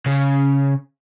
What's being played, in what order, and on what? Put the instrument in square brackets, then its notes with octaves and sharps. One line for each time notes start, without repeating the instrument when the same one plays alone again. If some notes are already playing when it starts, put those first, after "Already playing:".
[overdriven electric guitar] C#3